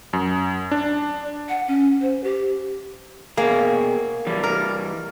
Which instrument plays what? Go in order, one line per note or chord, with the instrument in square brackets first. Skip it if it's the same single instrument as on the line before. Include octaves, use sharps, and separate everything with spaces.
[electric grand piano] F#2
D4
[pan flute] F#5
C#4
C5
G4
[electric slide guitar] B2 G#4 [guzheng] A#3
[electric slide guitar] E3 G3
[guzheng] A#4